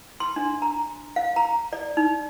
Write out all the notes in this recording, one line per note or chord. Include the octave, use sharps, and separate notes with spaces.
C6
D4
A#5
F5
A#5
D5
D#4